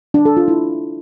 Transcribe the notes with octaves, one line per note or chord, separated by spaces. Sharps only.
D4
A4
F4
E4